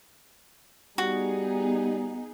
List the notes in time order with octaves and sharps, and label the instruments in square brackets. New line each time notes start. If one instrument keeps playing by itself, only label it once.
[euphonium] G3 [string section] B3 D#4 G#4 [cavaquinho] F#4